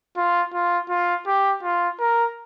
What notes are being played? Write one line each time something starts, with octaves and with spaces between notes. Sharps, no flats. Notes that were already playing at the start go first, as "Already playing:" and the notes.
F4
F4
F4
G4
F4
A#4